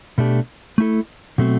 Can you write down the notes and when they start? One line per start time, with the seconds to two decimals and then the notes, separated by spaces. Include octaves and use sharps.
0.18 B2 A3 D4 G4
0.78 A3 E4 A4
1.38 B2 F#3 A3 C4 F#4